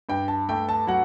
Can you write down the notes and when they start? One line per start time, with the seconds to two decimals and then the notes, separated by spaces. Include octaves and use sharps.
0.09 G2 G5
0.28 A5
0.49 A3 G5
0.69 A5
0.87 F#3 F#5